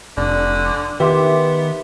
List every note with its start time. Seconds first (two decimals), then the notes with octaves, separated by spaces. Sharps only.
0.17 F1 D3 D5
1.00 D#3 B3 G4 B4 E5 C6 D6